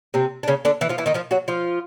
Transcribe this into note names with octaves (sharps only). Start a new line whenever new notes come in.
C3 C4
D4
C#3 C#4
D3 D4
E3 E4
F3 F4
E3 E4
D#3 D#4
F3 F4
F#3 F#4
F3 F4